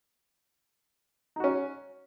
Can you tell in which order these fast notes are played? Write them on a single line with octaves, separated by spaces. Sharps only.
D#4 F#4 C#4